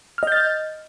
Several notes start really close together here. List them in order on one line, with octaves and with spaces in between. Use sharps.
F6 D#5 G6 A6